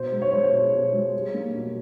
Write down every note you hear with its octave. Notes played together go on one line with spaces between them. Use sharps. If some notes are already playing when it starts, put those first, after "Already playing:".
Already playing: B2 C5
G#3
C#5
G#3 C5
C#5
B2
B2
G#3
G3
A#3
B2